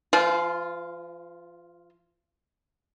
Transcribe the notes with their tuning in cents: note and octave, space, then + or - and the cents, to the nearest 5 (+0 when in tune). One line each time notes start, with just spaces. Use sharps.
F3 -45 F4 +0